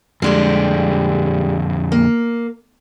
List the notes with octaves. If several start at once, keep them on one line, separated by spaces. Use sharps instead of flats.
F2 D3 G3 G#3 G4
A#3